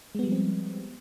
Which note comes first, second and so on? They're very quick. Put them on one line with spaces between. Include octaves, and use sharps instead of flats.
G#3 B3 G3 F3 C4